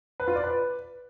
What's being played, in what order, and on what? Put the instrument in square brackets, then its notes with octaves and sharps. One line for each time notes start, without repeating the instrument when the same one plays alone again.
[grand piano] B4
F4
D5
B4